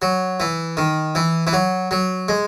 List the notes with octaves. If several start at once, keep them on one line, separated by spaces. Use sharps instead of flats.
F#3
E3
D#3
E3
E3
F#3
F#3
G#3